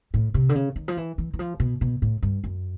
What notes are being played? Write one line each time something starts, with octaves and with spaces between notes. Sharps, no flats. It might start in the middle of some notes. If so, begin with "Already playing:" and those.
A2
C3
D3
C#3
D#3
F3
E3
E3
E3
F3
B2
B2
A2
G2
F#2